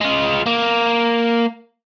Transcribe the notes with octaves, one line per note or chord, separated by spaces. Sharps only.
G#3 F4
A#3